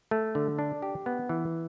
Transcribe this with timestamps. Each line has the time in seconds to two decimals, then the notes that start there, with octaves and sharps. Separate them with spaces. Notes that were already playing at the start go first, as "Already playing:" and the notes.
0.11 A3
0.35 D3
0.59 D4
0.82 G4
1.06 B3
1.29 E3